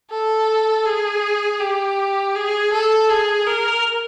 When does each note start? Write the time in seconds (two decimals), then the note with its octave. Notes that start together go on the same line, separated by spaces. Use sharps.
0.10 A4
0.86 G#4
1.60 G4
2.35 G#4
2.73 A4
3.09 G#4
3.47 A#4